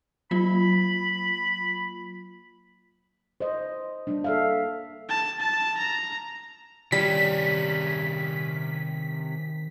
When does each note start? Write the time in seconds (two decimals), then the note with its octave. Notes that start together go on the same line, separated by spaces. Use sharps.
0.31 F#3 A#3 F4 B5
3.41 C5 D#5
4.07 G3 A#3 D4
4.24 A4 E5 F5
5.09 A5
5.40 A5
5.78 A#5
6.92 C3 D#3 G3 C#4 B6